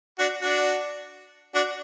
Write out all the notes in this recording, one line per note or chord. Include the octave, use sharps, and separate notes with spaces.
D4 F#4
D4 F#4
D4 F#4